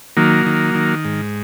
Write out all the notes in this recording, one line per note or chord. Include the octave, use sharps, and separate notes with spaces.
D#3 F#3 A#3
D#3
D#3
G#2